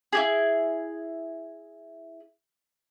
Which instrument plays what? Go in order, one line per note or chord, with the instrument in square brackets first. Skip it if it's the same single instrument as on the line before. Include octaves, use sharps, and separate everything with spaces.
[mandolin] E4 G4 G#4